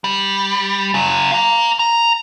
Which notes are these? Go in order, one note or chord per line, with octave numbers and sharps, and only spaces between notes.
G3
C#3 F#3
F5 A#5
A#5